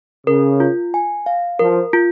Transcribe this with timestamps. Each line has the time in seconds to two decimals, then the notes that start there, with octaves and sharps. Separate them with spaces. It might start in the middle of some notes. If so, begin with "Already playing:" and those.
0.27 C#3 A#4
0.60 F4
0.94 G#5
1.26 F5
1.59 F3 A#4
1.93 F4